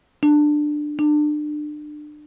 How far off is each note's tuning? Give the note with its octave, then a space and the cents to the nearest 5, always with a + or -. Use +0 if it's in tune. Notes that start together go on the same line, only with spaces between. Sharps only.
D4 +15
D4 +30